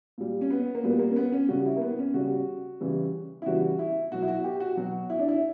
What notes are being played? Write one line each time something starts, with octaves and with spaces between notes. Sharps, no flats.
A#2 G3
C#4
B3
A#3
A#2 G3 B3
A#3
C#4
B3
C#4
C#3 G3 F#4
E4
A#3
B3
C#4
C#3 G3 F#4
C#3 E3 G3
E4
C#3 E3 G3 F#4
E4
B2 F#3 F#4
E4
F#4
G4
F#4
B2 F#3 F#4
E4
D4
E4